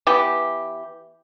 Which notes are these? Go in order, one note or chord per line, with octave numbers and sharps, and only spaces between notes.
E3 B3 G4